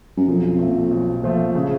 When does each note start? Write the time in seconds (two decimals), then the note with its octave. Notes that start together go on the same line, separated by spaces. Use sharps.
0.17 F#2
0.28 B1 F2
0.59 A#2 F3 A3
0.91 B1
1.23 A#2 F3 A3
1.55 C#3